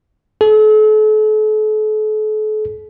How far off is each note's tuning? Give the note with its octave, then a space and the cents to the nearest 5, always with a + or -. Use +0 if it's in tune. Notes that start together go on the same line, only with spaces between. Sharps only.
A4 -40